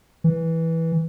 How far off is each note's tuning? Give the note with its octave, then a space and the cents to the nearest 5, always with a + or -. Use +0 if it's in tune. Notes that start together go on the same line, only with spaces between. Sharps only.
E3 -10